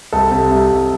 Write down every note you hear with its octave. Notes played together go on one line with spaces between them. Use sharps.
C2 A4
C3
C2
C2